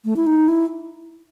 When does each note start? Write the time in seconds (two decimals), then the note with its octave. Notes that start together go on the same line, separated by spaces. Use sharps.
0.05 A3
0.16 E4
0.27 D#4
0.48 E4